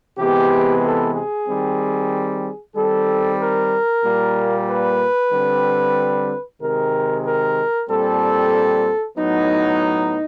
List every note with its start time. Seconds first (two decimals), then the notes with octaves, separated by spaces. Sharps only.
0.18 C3 E3 G#3 B3 G4
0.82 A4
1.14 G#4
1.48 D#3 G3 C4
2.75 D#3 G3 C4 A4
3.40 A#4
4.04 A#2 G3 A#3
4.69 B4
5.32 D3 G3 C4
6.61 C3 D#3 G#3 A#4
7.26 A#4
7.89 A#2 G3 C4 A4
9.18 A2 F#3 B3 D#4